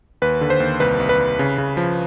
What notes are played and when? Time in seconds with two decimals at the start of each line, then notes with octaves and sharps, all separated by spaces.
0.22 D#2 B4
0.41 D3
0.50 C5
0.60 D#2
0.80 C2 B4
1.00 C2
1.09 B4
1.19 C2
1.39 C#3
1.58 C#3
1.77 F3